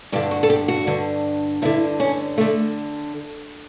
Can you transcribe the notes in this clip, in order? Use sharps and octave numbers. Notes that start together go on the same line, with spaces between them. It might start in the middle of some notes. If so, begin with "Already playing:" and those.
G2 D3 G4
F#4
A4
G4
F#4
G2 D3
G2 D3 E4
C#4
A3
D3